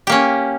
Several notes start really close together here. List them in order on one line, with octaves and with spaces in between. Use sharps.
G4 A#3 C#4